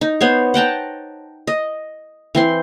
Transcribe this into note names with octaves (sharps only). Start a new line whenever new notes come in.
D#4
B3 C5 C#5
F#5 G5 A5 A#5
D#5
E3 C4 C6